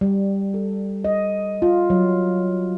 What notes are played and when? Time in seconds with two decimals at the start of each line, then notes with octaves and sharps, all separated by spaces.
0.01 G3
0.54 A4
1.04 D#5
1.62 F4
1.90 F#3